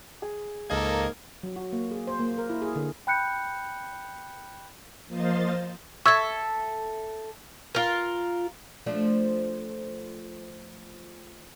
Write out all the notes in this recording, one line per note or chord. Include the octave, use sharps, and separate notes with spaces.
G#4
C#2 G#2 D#3 A#3 A4 D#5 F5 G#6
F#3
F#4
A#3
G#4
C5
A#3
A#4
E4
G#4
D3
G5 B5 F#6 G6 C#7
F3 A#3 C5 D#5 F5 A6
A4 E5 C#6 E6 G#6
F4 A#4
F3 A3 D4